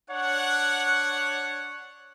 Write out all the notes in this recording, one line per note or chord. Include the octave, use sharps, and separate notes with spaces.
D4 C#5 F#5